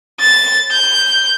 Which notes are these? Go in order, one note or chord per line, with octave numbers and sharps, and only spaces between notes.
A6
G6